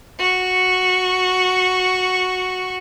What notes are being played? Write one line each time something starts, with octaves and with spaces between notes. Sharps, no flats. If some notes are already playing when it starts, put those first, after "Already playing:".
F#4 C#6